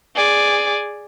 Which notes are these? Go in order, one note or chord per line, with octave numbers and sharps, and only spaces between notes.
G#4 D5